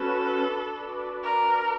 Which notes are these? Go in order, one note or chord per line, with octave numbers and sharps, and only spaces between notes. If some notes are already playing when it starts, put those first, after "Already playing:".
Already playing: C#4 F#4 A4 B4
D4 F#4 B4 D5
A#4